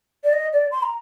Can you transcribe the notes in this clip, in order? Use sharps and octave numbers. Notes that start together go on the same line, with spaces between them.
D5
D#5
D5
C6
A#5